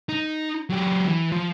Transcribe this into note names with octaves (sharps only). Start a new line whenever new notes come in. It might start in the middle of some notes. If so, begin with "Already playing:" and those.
D#4
F#3 G4
E3
F3